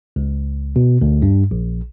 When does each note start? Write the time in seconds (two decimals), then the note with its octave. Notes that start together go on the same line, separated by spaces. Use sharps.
0.16 C#2
0.76 B2
1.01 D2
1.22 G2
1.51 A#1